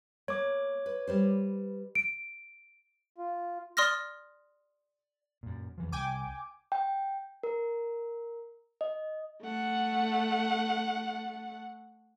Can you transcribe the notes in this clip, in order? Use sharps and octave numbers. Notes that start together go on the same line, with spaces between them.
A#3 C#5 D6
B4
G3 B4 C5
D7
F4
D5 C6 D#6 F6 A#6
F#2 A#2
E2 E3 F3
C2 G5 G#5 D6
G5
A#4
D#5
A3 F#5